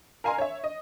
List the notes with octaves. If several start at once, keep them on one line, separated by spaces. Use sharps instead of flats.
A#4 F5 G#5 A#5 C6
C#5 E5
D#5